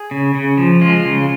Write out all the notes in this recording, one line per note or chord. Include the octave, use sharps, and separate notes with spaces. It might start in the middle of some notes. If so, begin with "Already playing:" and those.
Already playing: G#4
C#3
C#3
F3
G#3 F4
C#3